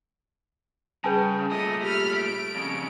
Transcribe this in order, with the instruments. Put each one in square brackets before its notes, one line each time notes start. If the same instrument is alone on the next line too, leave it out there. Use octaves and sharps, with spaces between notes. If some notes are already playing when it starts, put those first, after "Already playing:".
[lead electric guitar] C#3 [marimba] G3 G#4 G6 [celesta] B4 G#5 A5
[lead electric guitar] A#2 A3 [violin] D#5 D#6
[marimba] G4 [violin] B5 F6
[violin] D7
[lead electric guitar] F2 C#3